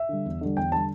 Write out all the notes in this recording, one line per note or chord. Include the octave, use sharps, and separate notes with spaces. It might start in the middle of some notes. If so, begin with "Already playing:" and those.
Already playing: E5
D3 G3
E2
D3 G3
E2 G5
D3 G3 A5